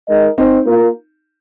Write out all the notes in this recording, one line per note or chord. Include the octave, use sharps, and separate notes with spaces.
G#3 D#4 A#4 D#5
C4 D#4
A#3 F4 A#4